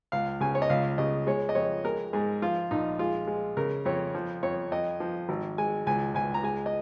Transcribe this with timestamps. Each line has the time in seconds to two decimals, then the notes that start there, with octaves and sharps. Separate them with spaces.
0.12 C#2 F5
0.41 C#3 G#5
0.55 C#5
0.62 D#5
0.70 C#2 F5
0.98 C#3 D#5
1.27 G#3 C#5
1.49 D#5
1.55 F2 C#5
1.84 G#3 A#4
2.13 G#2 G#4
2.42 F3 F4
2.71 A#1 D#4
2.99 G#3 F4
3.27 G#3
3.57 C#3 A#4
3.85 F2 C#5
4.15 F3
4.43 F2 C#5
4.71 F2 D#5
5.00 F3
5.29 G#1
5.58 G#3 G#5
5.87 C#2 G#5
6.14 C#2 G#5
6.34 A#5
6.43 G#3 G#5
6.66 D#5